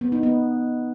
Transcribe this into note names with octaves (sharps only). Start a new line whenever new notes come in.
B3
D#4
B3